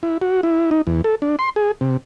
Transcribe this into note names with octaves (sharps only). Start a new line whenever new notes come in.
E4
F#4
E4
D#4
E2
A4
D4
C6
G#4
C3